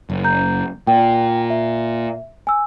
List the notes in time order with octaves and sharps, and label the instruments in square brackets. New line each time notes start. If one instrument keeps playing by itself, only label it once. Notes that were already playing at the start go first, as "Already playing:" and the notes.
[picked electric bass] F#1
[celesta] A#5 G6
[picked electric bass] A#2 [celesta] G5
[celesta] E5
G#5 E6